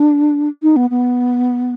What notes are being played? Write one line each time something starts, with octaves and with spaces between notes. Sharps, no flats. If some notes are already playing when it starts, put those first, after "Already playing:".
Already playing: D4
D#4
B3
B3